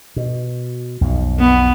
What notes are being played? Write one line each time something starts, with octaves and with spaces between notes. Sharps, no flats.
B2
B1 F2 B2
B3